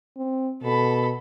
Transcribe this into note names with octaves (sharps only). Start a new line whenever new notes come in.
C4
B2 A4 B5